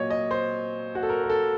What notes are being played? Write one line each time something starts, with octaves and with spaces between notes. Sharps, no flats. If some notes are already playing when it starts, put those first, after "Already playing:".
Already playing: A#2 F#3 C#5 D#5
D#5
C5
F#4
A4
A#4
A#4
A4